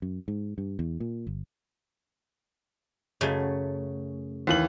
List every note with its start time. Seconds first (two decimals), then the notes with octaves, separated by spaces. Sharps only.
0.02 F#2
0.28 G#2
0.58 G2
0.79 E2
1.00 A#2
1.27 G1
3.21 F#2 C#3 A3
4.47 D#2 E3 F#7